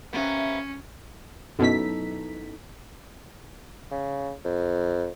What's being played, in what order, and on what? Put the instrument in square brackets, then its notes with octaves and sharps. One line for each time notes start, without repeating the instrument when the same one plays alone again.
[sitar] C3 A#3 B3 [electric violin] C#4
[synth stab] F#2 B2 B6 [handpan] D#4 E4 A4
[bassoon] C#3
F2